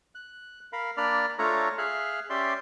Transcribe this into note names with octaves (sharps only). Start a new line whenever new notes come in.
F#6
A#4 F5 B5
A#3 D4 D5 B5 F6
A3 D4 F4 A4 C#5 A#5
G#4 E5 F5 F6 F#6
C#4 G4 D5 E5 C6